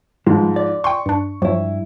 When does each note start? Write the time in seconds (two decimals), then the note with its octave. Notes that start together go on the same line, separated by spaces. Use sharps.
0.26 G#2 F3 G3 G#3
0.56 D5
0.84 G5 C6 C#6
1.06 G2 D4
1.42 G2 F3 F#3 E4